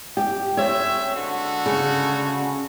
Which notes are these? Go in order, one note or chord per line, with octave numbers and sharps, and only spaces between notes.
G4
C4 C#4 C#5 E5
D3 G#3 F#4
C#3